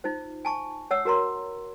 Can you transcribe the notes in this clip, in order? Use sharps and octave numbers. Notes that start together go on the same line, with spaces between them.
D#4 F4 C5
G#5 A5 C#6
C#5 F#5 E6
F#4 A#4 A#5 C6